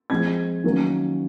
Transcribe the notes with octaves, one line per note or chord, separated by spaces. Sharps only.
F3 G#3 C4 G#6
D#3 F#3 A#3 C#4